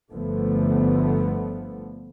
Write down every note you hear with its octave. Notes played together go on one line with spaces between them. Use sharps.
G1 D3 F3 A3 B3